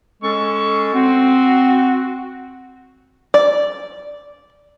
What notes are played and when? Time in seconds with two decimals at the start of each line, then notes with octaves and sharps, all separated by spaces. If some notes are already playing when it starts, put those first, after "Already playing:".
0.23 G#3 C#4 A4 C#6
0.94 C4 F#4
3.34 D5